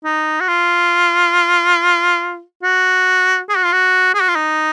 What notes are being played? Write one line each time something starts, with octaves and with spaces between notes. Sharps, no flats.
D#4
F#4
F4
F#4
G#4
F#4
F4
F#4
G#4
F#4
F4
D#4